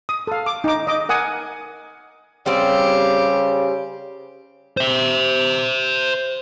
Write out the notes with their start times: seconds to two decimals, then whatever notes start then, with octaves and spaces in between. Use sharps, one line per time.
0.09 D#6
0.27 A4 F5
0.46 D6
0.64 D#4 D6
0.87 D#5 D6
1.09 A#4 F#5 G#5 D#6
2.46 C#3 G3 C4 G4
4.77 C5 E5